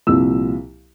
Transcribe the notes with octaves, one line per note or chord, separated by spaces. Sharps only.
C2 A#2 F3 E6